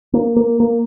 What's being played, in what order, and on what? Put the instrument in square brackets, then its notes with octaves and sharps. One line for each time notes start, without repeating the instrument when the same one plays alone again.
[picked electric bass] A#3
A#3
A#3